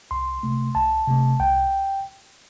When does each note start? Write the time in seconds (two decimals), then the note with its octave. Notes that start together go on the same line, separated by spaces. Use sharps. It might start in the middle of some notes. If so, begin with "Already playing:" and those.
0.11 C2 C6
0.43 C3 A3
0.75 C2 A5
1.07 C3 A3
1.40 C2 G5